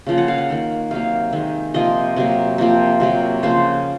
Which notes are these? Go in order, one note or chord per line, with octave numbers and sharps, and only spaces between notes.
C#3 F3 A#3
F#5
F5
F#5
D#3 A#3
C3 F#3 A#3 F5
D#3 G#3
C3 F3 A#3 D#5
C3 F#3 A#3
C3 F3 A#3
C3 F#3 A#3
C#3 F3 A#3 C5